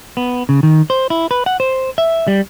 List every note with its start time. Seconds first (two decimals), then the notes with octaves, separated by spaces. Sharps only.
0.17 B3
0.49 C#3
0.63 D#3
0.90 C5
1.10 E4
1.31 B4
1.46 F#5
1.60 C5
1.98 E5
2.28 G3